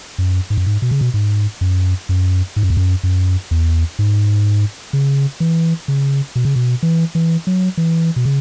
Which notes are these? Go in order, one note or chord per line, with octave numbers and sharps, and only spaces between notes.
F#2
G#2
F#2
G#2
B2
C#3
B2
G#2
F#2
F#2
G#2
F#2
E2
F#2
F#2
E2
G#2
C#3
E3
C#3
B2
C#3
B2
E3
E3
F#3
E3
B2
C#3